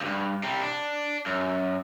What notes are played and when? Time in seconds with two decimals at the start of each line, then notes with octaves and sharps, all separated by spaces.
0.01 C#2 G2
0.43 C3 G3
0.62 D4
1.26 F#2